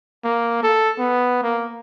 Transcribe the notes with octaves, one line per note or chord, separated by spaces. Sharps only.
A#3
A4
B3
A#3